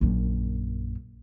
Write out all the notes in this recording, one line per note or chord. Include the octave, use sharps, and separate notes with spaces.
A#1 F#2